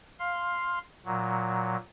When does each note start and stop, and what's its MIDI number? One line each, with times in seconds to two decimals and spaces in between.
0.19 0.79 77
0.19 0.79 84
1.05 1.76 46
1.05 1.76 54